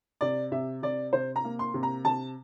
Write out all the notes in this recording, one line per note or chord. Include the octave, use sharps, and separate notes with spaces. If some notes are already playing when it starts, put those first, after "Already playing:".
C3 D5
C3 E5
C3 D5
C3 C5
A#5
A#3
C6
C3
A#5
C3 A5